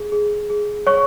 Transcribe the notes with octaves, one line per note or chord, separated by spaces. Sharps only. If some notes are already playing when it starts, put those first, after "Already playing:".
Already playing: G#4
G#4
G#4
C#5 C#6